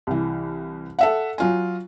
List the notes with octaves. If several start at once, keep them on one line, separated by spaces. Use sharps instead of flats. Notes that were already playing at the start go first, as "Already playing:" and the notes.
C2 E3
A4 E5 F#5
F#3 F4 G#5